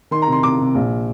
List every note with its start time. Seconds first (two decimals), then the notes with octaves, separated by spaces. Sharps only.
0.11 D#3 C6
0.22 A#5
0.27 C3 C6
0.43 C3 D6
0.59 C3
0.75 A#1